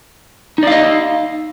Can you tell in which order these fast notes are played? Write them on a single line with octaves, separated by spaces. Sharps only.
D#4 D5 F5 D#5